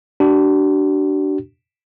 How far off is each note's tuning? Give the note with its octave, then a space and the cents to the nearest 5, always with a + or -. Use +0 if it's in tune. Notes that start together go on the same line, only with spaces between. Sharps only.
D4 +0 F#4 +45